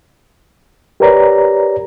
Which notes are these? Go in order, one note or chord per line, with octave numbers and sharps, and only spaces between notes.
G4 A#4 B4 C#5 D5 A#5